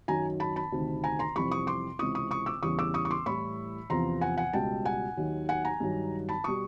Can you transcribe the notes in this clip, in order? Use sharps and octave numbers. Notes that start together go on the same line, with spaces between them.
F#2 D#3 F#3 G#5 A#5
A5 B5
A5 B5
D2 C3 D#3
G#5 A#5
A#5 C6
F2 C3 E3 G3 B5 C#6
C#6 D#6
C6 D6
C#2 C3 E3 C#6 D#6
C#6 D#6
C#6 D#6
D6 E6
E2 C#3 E3 G3 C#6 D#6
D6 E6
C#6 D#6
C#6
C6 D6
A2 E3 G3 B5 C#6
E2 C3 F3 A#5 C6
F#5 G#5
F#5 G#5
C#2 B2 G3 G5 A5
F#5 G#5
D#2 D#3 F#3
F#5 G#5
G#5 A#5
G2 D#3 F#3
A5 B5
B2 G3 C#6 D#6